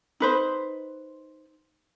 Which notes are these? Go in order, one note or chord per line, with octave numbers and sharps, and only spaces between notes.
D#4 B4 C5